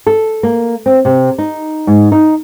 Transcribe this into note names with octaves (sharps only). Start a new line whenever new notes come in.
A4
A#3
C4
C3
D#4
G#2
D#4